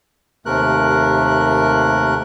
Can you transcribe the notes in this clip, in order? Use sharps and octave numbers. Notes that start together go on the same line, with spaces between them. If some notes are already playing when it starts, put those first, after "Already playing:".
D#2 C3 A3 A#4 F#6